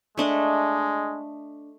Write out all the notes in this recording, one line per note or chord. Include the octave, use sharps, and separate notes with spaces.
G#3 A3 D4 D#5